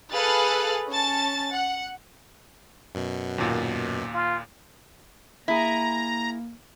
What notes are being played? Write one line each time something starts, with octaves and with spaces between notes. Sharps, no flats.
G#4 A4 B4 F5 F#6 A6
C#4 A5 A6
F#5
F#2 B2
D#2 A#2
F4
A#3 E4 G#4 A#5